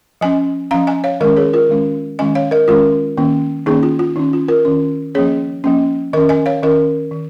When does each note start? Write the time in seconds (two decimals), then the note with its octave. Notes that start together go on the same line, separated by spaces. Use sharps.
0.21 F3 C#4 D#5 G#5
0.71 F3 C#4 F5 A#5
0.87 D#5 G#5
1.04 C#5 F5
1.20 D#3 G#3 C#4 A#4 D#5
1.37 G#4 C#5
1.53 F4 A#4
1.69 D#3 G#3 C#4
2.19 D#3 G#3 C#4 D#5 G#5
2.35 C#5 F5
2.51 A#4 D#5
2.68 D#3 G#3 C#4 F4 A#4
3.17 D#3 A#3 C#4
3.66 D#3 A#3 C#4 D#4 G#4
3.83 F4
3.99 F4
4.16 D#3 C#4 D#4
4.33 F4
4.48 F4 A#4
4.65 D#3 C#4
5.15 F3 A#3 C#4 G#4 C#5
5.64 F3 A#3 C#4
6.13 D#3 C#4 A#4 D#5
6.29 D#5 G#5
6.46 C#5 F5
6.63 D#3 C#4 A#4 D#5
7.11 D#3